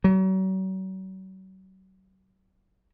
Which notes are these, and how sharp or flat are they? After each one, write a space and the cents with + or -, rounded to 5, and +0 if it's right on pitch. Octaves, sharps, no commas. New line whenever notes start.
F#3 +40